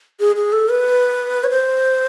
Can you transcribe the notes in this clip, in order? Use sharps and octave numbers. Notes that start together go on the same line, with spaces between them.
G#4
G#4
A4
B4
C#5
C5